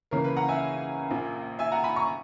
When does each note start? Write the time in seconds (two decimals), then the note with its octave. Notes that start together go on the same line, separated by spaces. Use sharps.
0.11 C#2 C#3 E3 A#3 C#4 A#4
0.24 B4
0.36 F#5 A#5
0.49 E5 G#5
1.10 A#1 A#2 A#3
1.59 E5 G#5
1.72 F#5 A#5
1.84 G#5 B5
1.96 A#5 C#6